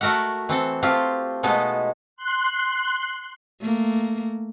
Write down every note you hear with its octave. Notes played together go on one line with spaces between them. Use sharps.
A3 F#4 A#4 E5 F#5
E3 C4 A4
A3 C4 F4 G4
B2 G#3 A3 B3 D#4 A5
C6 F#6
A3 A#3